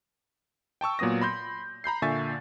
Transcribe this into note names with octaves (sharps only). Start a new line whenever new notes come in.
G5 A5 C#6 E6
A#2 F#3 B3 D#6 A#6
B5 C6 G6
A#5 B5 G6 C7
A#2 D3 E5 G#5 C#6 A6